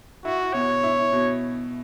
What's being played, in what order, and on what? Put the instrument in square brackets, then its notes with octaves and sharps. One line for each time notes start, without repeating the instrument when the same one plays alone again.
[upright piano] E4 [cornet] F#4
[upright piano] B2 [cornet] C#5
[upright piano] E4
B2